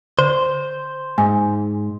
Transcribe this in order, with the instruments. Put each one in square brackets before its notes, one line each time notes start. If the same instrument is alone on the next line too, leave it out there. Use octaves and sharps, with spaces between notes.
[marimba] D3 [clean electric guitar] C5
[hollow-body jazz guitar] G#2 [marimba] G#5